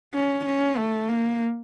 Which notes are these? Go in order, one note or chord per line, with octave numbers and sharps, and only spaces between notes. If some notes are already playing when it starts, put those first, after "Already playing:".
C#4
C#4
A3
A#3